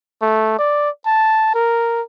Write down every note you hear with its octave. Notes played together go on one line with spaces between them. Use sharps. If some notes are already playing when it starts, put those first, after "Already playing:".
A3
D5
A5
A#4